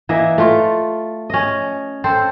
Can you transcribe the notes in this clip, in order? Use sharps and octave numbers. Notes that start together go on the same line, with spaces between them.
E3 A#3 D#5 E5
A3 F4
C#4 D#5
C4 A4 C5